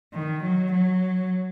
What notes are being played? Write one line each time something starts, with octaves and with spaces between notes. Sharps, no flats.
D#3
F#3
F#3